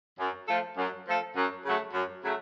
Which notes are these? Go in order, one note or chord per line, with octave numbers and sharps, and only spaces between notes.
F#2
F3 A3 F4 A4
F#2
F3 A3 F4 A4
F#2
C#3 F#3 A3
F#2
C#3 F#3 A3